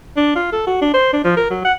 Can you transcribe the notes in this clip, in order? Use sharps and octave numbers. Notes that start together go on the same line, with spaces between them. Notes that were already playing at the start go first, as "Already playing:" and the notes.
D4
F4
A4
F#4
D4
C5
D4
F3
A#4
F#3
F#5